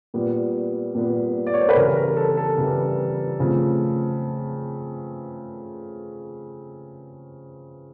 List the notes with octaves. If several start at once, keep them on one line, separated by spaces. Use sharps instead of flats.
A#2 G3 B3
A#2 G3 B3
D5
C#5
C5
B4
C#3 E3 G3 A#4
A#4
A4
A4
C#3 E3 G3
C#3 F3 A3 C4